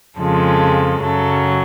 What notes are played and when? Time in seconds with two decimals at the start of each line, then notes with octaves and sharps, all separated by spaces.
0.17 F2 C#3 F3 G#3 A4
1.00 F#2 C#3 F#3 A4